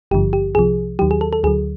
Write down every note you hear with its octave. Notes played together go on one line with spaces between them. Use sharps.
G#1 G2 D3 F3 G4
G4
C2 C3 F3 G#4
D#2 D#3 F#3 G4
G#4
A4
A4
D2 D3 F#3 G#4